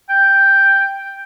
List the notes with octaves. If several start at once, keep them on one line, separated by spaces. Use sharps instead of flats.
G5